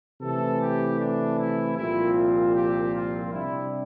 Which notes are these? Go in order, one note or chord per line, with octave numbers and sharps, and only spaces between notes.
C3 E3 A3 A4
G4
D4
E4
C2 A#2 F3 C4 E4
F4
G4
F4
C3 G3 D4 E4